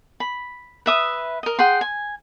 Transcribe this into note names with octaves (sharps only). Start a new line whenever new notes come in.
B5
B4 E5 D#6
A#4 D#5
G#4 F#5 G5 C6
G#5